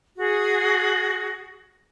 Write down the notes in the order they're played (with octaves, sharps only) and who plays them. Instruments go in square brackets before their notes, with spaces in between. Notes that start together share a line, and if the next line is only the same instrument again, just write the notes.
[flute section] F#4 G#4